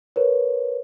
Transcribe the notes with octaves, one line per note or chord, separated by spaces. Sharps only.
A#4 B4 C#5